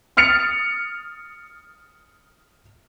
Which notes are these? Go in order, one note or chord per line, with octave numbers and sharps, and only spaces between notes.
D#6 F6 A6 C#7 F7